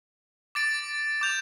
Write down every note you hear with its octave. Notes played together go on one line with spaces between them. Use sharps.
D6 A6 D7
D6 G6 F7